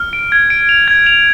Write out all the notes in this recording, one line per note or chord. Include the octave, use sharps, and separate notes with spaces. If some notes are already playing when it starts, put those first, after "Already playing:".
Already playing: F6
D7
G#6
D7
F7
G#6
F7